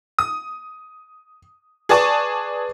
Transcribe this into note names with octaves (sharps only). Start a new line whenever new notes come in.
D#6
G#4 B4 D5 G#5 A5 C#6